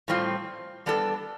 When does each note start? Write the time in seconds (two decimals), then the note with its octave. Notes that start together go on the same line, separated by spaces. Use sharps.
0.08 A2 G3 C4 F4
0.86 G3 B3 D4 A4